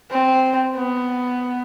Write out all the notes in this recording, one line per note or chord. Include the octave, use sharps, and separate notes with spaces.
C4
B3